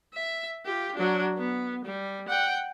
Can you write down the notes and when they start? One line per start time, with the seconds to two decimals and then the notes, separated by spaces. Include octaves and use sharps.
0.14 E5
0.65 F4 G4
0.95 F#3 D4
1.37 B3
1.85 G3
2.28 F#5 G5